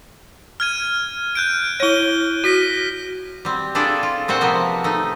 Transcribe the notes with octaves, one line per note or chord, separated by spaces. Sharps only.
F6 G#6 D#7
F#6 G6 D7
E4 C#5 D#7 G7
F#4 A#6 B6 D#7
G3 C4
D4 E4 F4 G#4 A4 D5
F4
A#2 C4 F#4 C5 F#5
C3 F3 A#3 B3
A3 D#4